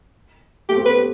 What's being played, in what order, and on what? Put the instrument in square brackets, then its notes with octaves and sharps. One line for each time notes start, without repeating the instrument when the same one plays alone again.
[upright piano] A3 [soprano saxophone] G4
[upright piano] C4
B3
[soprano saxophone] B4
[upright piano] G4